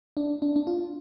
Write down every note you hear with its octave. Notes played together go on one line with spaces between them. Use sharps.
D4
D4
D4
F4